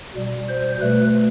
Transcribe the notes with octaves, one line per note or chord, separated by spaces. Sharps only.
B2 G3
C5
B2 A3 B4